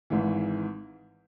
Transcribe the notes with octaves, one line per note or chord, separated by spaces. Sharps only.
G#1 G#2 E3